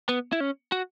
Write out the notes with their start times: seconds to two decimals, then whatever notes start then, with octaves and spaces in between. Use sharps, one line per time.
0.09 B3
0.33 E4
0.40 C#4
0.72 F#4